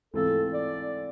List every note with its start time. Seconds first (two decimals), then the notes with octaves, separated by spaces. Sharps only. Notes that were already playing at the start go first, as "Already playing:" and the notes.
0.14 G#2 E3 A3 C4 F4 A4
0.53 D5